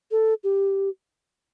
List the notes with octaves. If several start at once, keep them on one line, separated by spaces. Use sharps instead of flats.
A4
G4